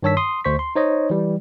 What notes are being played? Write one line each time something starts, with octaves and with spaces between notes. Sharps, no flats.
G2 D#3 C#5 A5 E6 B6
C6 D#6
D2 C5 C#6 B6
C6
D#4 C5 C#5 D#5
E3 G3